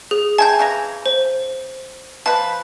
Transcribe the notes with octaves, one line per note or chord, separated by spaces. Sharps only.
G#4
C3 E4 G#5 A5 G6
C#3 E3 A#5
C5
F3 B4 A5